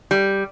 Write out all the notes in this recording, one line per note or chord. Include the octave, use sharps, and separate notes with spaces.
G3